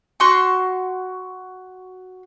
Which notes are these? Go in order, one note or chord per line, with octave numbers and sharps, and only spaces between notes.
F#4 C6 C#6